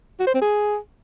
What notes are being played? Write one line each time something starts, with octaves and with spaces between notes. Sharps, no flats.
F#4
C5
C4
G#4